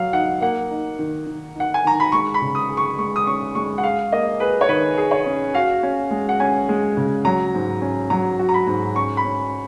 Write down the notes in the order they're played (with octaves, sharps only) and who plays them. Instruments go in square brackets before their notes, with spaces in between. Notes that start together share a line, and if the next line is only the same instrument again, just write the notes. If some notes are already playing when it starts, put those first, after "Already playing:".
Already playing: [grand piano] F#3 [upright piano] F5
[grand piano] D#4 [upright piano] F#5
[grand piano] A#3 [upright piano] F#5
[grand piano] D#4
D#3
D#3
[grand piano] D#4 [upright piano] F#5
[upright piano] G#5
[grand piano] D#3 [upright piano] A#5
[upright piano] B5
[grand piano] G#3 [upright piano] C#6
[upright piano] B5
[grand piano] C#3
[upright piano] D#6
[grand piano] G#4
[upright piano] C#6
[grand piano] G#3 [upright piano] C#6
[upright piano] D#6
[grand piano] C#4 [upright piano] C#6
[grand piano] G#3 [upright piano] C#6
[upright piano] F#5
[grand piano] G#4 [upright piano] F5
[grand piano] A#3 [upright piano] D#5
[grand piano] G#4 [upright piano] B4
[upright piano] C#5
[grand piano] D#3 [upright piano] B4
[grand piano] G#4
[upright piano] C#5
[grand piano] C#4
[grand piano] F#4 [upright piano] F5
[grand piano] C#4
G#3
[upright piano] F#5
[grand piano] C#4 [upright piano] G#5
[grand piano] G#3
C#3
[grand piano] F#3 [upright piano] A#5
[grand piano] G#2
C#4
[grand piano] F#3 [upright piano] A#5
[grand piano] F#4
[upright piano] A#5
B5
[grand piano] G#2
[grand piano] C#4 [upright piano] C#6
[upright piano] B5
[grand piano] C#4